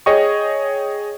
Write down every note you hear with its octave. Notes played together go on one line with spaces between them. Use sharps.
G#4 C#5 D#5 G5 C#6